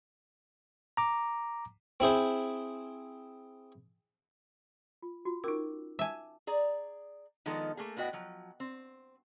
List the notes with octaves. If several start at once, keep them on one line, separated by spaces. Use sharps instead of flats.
A#5 D6
C4 E4 G#4 C5
F4
F4 F#4
C#4 D#4 A#4 D6 E6
E5 G#5 A5 D6
G#4 D5 A#5
D#3 F3 G#3 B3 D#4 A4
A3 A#3 G#4
A2 B3 F#4 D#5 G5
F3 F#3
C4